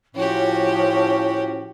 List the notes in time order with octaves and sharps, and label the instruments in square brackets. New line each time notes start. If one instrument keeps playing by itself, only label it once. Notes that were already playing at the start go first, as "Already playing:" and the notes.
[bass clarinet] A2 [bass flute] F3 [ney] C#4 [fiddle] F#4 G4